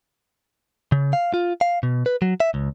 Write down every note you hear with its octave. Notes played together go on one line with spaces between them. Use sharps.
C#3
F5
F4
F5
B2
B4
F#3
E5
C#2